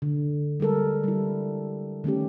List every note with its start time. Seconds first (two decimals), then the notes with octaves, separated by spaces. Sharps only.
0.02 D3
0.60 G3 G#3 A4 A#4
1.04 G3 E4
2.04 D#3 A3 C#4 G4